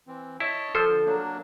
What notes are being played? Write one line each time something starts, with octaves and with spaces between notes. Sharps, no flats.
E3 C4
E4 C#5 D#5 A5
F3 A4 C5
D3
F#3 A#3 D4